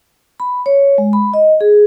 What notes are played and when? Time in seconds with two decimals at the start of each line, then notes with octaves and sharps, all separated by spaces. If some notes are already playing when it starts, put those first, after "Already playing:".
0.40 B5
0.66 C#5
0.98 G#3
1.13 B5
1.34 D#5
1.61 G#4